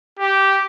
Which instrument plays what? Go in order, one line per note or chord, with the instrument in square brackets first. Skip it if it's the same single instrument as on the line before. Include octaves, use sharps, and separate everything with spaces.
[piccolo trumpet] G4